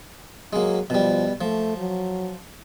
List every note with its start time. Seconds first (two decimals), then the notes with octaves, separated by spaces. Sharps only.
0.53 F#3 G#3 A#3
0.90 B2 F3 G3
1.41 F3 A3
1.77 F#3